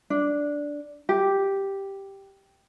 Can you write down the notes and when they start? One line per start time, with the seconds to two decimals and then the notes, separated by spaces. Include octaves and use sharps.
0.10 D4
1.09 G4